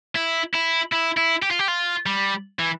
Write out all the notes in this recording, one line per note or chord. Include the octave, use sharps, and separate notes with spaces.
E4
E4
E4
E4
G4
F4
G4
F4
G3
E3